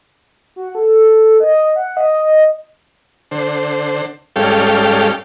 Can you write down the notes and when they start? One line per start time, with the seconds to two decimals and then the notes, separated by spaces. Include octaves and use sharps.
0.56 F#4
0.75 A4
1.40 D#5
1.76 F#5
1.97 D#5
3.31 D3 C5
4.36 G#2 G3 C#4 A4 F5 G5